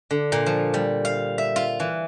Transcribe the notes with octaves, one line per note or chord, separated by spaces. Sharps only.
D3
A#2
F3
G3
F5
E5
F4
E3